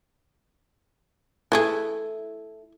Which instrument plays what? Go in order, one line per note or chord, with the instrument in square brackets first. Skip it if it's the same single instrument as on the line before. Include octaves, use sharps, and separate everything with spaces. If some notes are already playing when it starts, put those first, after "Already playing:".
[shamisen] E3 A3 G#4 [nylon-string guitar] E4 A4